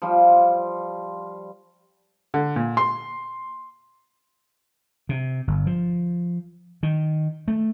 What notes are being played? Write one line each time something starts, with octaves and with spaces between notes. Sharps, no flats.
F3 G3 F4
D3
A#2
C6
C3
G1
F3
D#3
A3